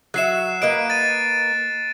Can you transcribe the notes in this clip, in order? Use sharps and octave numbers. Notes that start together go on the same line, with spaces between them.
F#3 F#4 E5 F#6 C7 E7
A#3 B4 D#5 D7
A6 D#7